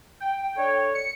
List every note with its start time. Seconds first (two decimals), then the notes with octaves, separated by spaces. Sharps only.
0.20 G5
0.56 D4 A4 C#5
0.95 C#7